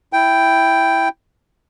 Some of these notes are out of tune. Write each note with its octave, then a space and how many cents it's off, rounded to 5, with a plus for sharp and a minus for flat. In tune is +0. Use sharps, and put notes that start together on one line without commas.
E4 +0 G5 +0